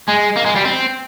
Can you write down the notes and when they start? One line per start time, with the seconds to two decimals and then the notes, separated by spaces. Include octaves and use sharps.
0.08 G#3
0.36 A#3
0.45 G#3
0.55 G3
0.65 C4